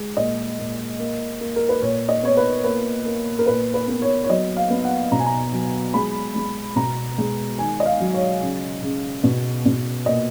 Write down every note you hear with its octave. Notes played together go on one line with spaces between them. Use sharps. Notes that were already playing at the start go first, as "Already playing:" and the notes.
Already playing: G#3
A#2 D#5
A#2
A#3
A#3
A#4
B4
A#2 C#5
D#5
B3 C#5
B4
A#3 B4
A#3
A#4
A#2 B4
B4
B3
C#5
C#5
F#3 D#5
F5
B3
F#5
B2 A#5
G#5
A#5
F#3
G#3 B5
G#3
B2 A#5
G#3
D#3 G#5
D#5
F5
F#3
C#5
C#3
C#3
B2
B2
A#2 D#5